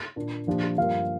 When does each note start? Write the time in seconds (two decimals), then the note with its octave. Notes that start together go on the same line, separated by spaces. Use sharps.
0.16 A#2 A#3 D4 F4
0.47 A#2 F3 D4 G4
0.78 G2 F3 A#3 G4 F5